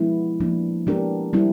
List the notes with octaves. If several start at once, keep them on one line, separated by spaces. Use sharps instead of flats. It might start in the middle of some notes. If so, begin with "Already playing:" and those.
Already playing: F3 G#3 B3 E4
F3 A#3 D4
G#3 B3 D4 G4 A#4
G3 C4 E4